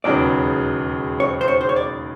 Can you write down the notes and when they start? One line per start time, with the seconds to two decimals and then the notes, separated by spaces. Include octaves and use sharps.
0.04 E1 D#2 C#3 F#3 B3 D5
1.20 C#5
1.41 C5
1.48 C#5
1.61 C5
1.69 C#5
1.76 D5